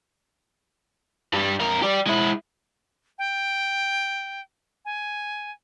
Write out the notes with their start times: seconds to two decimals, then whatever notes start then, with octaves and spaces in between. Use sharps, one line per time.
1.33 G2 G3
1.60 F2 A#4
1.82 G4 D5
2.07 G#3 E4
3.18 G5
4.85 G#5